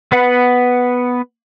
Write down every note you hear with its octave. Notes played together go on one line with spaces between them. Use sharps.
B3 B4 F#5